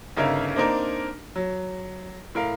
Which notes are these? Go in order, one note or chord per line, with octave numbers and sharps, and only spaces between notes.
G1 C#3 D#4 A#4 E5 F5
A#3 C4 D4 D#4 A#4
F#3
A2 A#4 F5